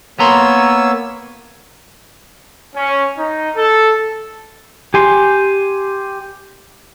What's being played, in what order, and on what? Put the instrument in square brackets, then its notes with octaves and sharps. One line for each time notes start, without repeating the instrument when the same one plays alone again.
[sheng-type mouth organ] A#3 C#5 E6 [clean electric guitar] B3 A#5 C6
[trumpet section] C#4
D#4
A4
[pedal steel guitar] G4 G#5 C6